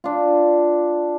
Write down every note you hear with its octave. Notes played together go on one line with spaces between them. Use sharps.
D4 F4